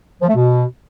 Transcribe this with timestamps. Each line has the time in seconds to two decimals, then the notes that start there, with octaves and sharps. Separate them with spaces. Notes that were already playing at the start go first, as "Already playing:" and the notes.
0.22 F3
0.28 A3
0.35 B2